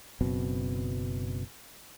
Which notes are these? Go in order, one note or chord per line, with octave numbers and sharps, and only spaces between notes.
F#1 F#2 B2 C4